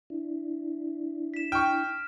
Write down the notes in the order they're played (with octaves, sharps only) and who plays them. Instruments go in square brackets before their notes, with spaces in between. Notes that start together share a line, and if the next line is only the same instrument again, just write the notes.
[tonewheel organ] D4 E4
[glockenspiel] B6 E7
[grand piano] G5 C#6 [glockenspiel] F6